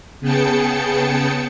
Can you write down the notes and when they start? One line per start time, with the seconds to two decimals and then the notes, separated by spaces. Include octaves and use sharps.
0.20 C#3 B3 G#4 G5 A5 C#7